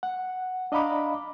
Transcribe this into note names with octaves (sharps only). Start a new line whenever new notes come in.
F#5
D4 D#5 F5 A#5 B5 D6